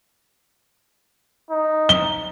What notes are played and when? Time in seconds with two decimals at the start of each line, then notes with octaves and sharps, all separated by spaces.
1.50 D#4
1.89 G7